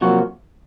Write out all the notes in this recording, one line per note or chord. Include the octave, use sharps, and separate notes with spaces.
C3 F3 F#3 A#3 F#4